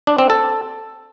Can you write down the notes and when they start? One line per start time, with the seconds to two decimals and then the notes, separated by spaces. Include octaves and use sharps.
0.07 D4
0.18 C4
0.30 A4